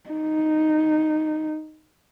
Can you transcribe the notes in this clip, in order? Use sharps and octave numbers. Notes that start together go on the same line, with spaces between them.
D#4